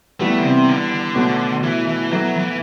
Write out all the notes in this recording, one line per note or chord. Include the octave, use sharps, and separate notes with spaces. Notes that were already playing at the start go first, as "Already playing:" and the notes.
E3 G3 A3 B3
D3
C3
D3
B2 F#3 A3
E3
E3
F#3 B3 E4 A4 E5
E3